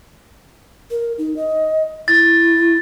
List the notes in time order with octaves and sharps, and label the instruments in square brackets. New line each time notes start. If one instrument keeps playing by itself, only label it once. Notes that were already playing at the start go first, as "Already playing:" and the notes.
[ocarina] A#4
D#4
D#5
[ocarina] E4 [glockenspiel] A6